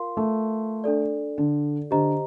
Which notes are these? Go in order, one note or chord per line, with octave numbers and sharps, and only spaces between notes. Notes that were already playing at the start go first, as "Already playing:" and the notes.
Already playing: F4 A#4 F5 C6
A3
D4 A4 D5
D3
D3 G4 C5 D#5 A#5